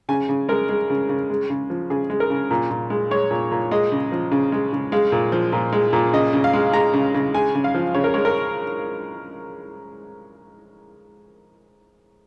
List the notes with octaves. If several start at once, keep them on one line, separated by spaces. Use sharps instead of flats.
C#3 G#5
C#3
G#3 A#4
G#3
C#3
C#3
G#3
C#3
F3
C#3 G#4
G#3
A#4
C#3
A#2
A#2
G#3
G#3 C#5
A#2
A#2
G#3 D#5
C#3
F3
C#3
G#3
C#3
G#3 F5
A#2
F3
A#2
G#3
A#2
C#3 D#5
C#3
F5
G#3
G#3 A#5
C#3
C#3
G#3 G#5
C#3
F5
F3
C#3 C#5
A#4
G#3 C#5
A#4